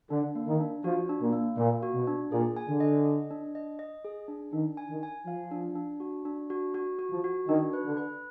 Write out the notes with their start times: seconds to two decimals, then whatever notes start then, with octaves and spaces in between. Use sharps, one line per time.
0.10 D3 D4
0.35 A#3
0.47 D#3
0.60 D4
0.84 F3 F#4
1.09 D4
1.21 A#2
1.33 A#3
1.57 A#2 A#3
1.83 F#4
1.94 B2
2.07 D4
2.32 A#2 G#4
2.56 G#5
2.69 D3
2.80 D#5
3.05 D#5
3.31 D4
3.55 D#5
3.79 D#5
4.05 G#4
4.28 D4
4.53 D#3 D4
4.77 G#5
4.90 D#3
5.03 G#5
5.26 F3 F5
5.51 D4
5.76 D4
6.00 F#4
6.25 D4
6.50 F#4
6.74 F#4
6.99 F#4
7.11 F3
7.24 F#4
7.48 D#3 D4
7.73 B4
7.86 D3
7.97 B4